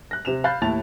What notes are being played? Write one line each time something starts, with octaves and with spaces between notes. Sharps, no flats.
F#6 A#6
C3 E7 F7
F5 B5 F#6 G6 A6
D#2 A2 E4 A5 A6 F7